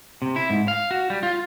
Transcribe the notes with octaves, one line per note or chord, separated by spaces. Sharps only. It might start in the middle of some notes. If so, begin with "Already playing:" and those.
C3
E4
G#2
F5
F#4
G3
F4